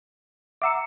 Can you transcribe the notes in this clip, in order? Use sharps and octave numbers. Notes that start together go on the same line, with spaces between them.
E5 F#5 A#5 D6 E6 C#7